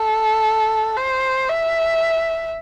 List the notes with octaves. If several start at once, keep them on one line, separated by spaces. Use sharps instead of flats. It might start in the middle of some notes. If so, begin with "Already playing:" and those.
Already playing: A4
C5
E5